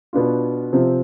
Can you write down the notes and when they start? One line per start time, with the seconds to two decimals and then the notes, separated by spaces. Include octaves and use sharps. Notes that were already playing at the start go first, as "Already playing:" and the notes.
0.13 B2 B3 D4 F4
0.73 C3 F3 C4